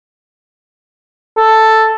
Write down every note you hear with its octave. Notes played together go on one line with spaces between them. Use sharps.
A4